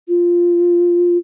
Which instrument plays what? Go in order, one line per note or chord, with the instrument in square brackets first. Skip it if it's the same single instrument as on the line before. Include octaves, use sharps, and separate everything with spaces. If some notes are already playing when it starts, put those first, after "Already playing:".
[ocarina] F4